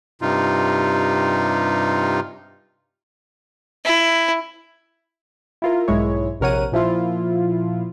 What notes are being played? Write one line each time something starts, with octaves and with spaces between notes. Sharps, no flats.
G2 C3 D#4 F4
E4
E4 F4 A#4
B1 G#2 G#3 E4 C#5
A#1 C3 A#4 C#5 F#5 D#7
A#2 F3 E4 F4